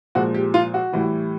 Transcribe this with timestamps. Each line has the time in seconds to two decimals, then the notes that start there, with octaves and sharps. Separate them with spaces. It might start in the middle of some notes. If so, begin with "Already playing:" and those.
0.15 A#2 F3 G#3 F#4
0.34 G4
0.54 F4
0.74 F#4
0.93 A2 E3 G3